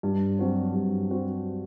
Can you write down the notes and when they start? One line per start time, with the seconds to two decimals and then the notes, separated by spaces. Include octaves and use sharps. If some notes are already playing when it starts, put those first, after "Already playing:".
0.03 G2
0.39 F#3 C4 F#4 C5
0.74 G2
1.09 F#3 C4 F#4 C5